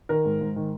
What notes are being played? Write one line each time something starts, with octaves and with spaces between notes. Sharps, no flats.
D#3 A#4
G#2
G#2
D#3